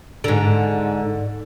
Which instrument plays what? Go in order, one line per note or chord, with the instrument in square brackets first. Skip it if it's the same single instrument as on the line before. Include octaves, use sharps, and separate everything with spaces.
[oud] G#2 D3